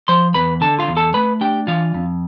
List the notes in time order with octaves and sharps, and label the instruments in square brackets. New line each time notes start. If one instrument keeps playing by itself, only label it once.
[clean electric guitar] F3 C5 C6
E2 B4 B5
D3 A4 A5
F4 F5
E2
A4 A5
A3 B4 B5
D4 G4 G5
E3 F4 F5
F2